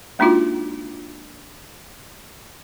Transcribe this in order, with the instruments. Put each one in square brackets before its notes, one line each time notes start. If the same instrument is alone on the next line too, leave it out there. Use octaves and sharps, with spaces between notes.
[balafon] G#3 A#3 D4 D#4 F4 F#4